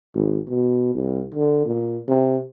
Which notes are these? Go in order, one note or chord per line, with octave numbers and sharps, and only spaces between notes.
G#1
B2
C2
D3
A#2
C3